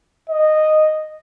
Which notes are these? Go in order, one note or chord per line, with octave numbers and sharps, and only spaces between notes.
D#5